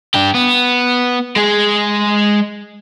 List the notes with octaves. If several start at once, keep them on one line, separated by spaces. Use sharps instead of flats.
D4 G4
B3
G#3 G#4